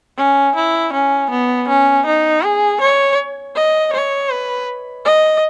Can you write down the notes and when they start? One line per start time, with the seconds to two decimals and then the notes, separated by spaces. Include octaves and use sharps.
0.17 C#4
0.55 E4
0.93 C#4
1.31 B3
1.69 C#4
2.06 D#4
2.42 G#4
2.81 C#5
3.55 D#5
3.93 C#5
4.30 B4
5.05 D#5